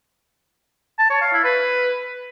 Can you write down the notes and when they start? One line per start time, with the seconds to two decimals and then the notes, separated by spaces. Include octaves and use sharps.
0.98 A5
1.10 C#5
1.21 F5
1.33 E4
1.44 B4